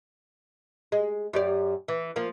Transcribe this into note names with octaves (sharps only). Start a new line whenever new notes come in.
G#3
F#2 G4 D5
E3
F3 A#3